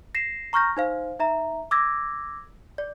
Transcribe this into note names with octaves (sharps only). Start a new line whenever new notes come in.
A#6 C7 E7
A#5 C#6 F6 G6 A#6
D#4 C5 F5
D#4 E5 A#5
D6 E6 G#6 A#6
D5